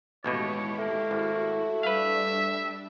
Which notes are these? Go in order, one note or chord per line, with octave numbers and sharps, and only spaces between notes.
A1 D#2 B2 G#3 E4 G4 C#5
A3 A#3
G#1 E4 F#4
G3 D4 B4 E5 F5